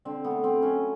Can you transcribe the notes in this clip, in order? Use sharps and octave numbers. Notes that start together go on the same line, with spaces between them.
D3 C4
B3
A3
C4
F#3
C#4